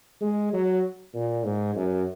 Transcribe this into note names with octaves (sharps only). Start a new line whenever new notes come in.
G#3
F#3
A#2
G#2
F#2